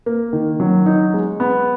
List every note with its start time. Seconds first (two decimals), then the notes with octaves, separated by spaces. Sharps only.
0.06 A#3
0.33 D#3
0.60 F#3
0.86 D#4
1.14 G#3
1.40 B3